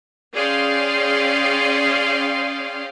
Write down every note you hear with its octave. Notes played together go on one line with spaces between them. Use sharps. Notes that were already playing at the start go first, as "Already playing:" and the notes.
C#4 G#4 D5 F5 G5 C6